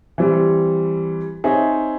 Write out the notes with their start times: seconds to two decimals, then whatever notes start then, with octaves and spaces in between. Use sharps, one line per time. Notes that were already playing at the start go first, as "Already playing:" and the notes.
0.18 E3 G3 C4
1.44 C4 D#4 G#4 C#5 E5